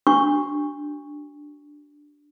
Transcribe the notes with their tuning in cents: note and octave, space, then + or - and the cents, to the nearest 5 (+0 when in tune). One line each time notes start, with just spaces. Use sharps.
D4 +0 F#4 +15 C#6 +0